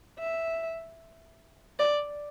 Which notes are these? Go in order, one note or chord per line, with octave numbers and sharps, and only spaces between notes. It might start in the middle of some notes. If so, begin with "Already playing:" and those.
E5
D5